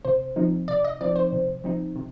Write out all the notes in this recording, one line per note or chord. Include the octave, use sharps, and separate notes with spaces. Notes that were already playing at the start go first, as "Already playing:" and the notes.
C3 C5
F3 C4 D#4
C3 D5
D#5
F3 C4 D#4 D5
C5
C3
F3 C4 D#4
C3